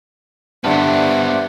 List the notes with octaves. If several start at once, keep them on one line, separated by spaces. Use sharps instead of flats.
G2 D3 B3 D4 C5 D5 E5 F#5